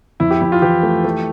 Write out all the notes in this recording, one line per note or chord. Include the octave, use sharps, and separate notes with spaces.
F2 E4
G4
F2 E4
F4
E3 G4
A3
A3